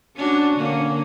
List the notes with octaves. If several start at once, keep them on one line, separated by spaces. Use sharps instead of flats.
C#4 D4 F#4
D3 A#3 C#4